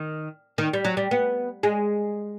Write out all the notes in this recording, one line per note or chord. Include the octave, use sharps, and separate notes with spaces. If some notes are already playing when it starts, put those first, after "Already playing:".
Already playing: D#3
D#3
G3
F#3
G3
B3
G#3